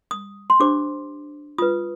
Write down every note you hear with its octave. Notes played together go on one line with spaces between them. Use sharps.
D#6
C6
D4 G4 C5 D6
F4 B4 D#6